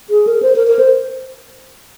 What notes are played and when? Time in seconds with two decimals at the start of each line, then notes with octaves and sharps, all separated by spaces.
0.10 G#4
0.27 A#4
0.42 C5
0.56 A#4
0.67 A#4
0.79 C5